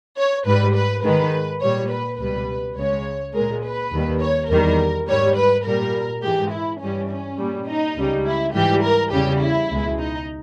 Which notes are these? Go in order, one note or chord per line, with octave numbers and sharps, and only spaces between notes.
C#5
G#2 G3 B4
B4
G#2 D#3 G#3 B4
A#2 G3 C#5
B4
C#2 B2 G3 B4
C#2 C#3 G#3 C#5
A#2 G#3 A#4
B4
D#2 D#3 G3
C#5
E2 D#3 G3 A#4
G#2 G3 C#5
B4
A#2 G3 A#4
G#2 E3 G#3 G4
E4
G2 E3 G3 C#4
C#4
A#2 G3
D#4
C#2 C#3 G3
E4
G#2 E3 G3 G4
A#4
E2 C#3 G3 G4
E4
C#2 B2 G#3
D#4